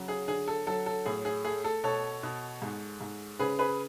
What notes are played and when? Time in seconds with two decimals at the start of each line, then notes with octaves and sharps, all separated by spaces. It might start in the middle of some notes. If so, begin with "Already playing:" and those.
Already playing: C#3 F#3
0.08 G#4
0.28 D3 G#4
0.48 A4
0.67 F#3 A4
0.86 A4
1.06 A2 G#4
1.25 G#4
1.45 A3 G#4
1.64 A4
1.83 B2 A4 C#5
2.23 B2
2.62 G#2
3.01 G#2
3.39 C#3 G#4 B4
3.59 G#4 B4